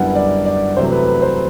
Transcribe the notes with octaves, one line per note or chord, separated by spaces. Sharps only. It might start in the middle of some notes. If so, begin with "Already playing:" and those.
Already playing: F#2 D3 G3 B3 E4 F#5
D5
D5
E2 C3 F#3 A3 C5
B4
B4
C5